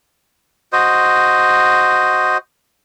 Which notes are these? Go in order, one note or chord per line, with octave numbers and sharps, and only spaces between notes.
F#4 C5 D#5